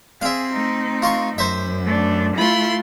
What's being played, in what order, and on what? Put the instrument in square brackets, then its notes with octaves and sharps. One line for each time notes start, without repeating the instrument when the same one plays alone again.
[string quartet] C4 [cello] G#4 [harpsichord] E5 F5
[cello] A3 D#4
[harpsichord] F4 C6 C#6
[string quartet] F#2 [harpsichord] C5 E5
[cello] A3 D4
[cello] A3 F4 [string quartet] E4 B5 C6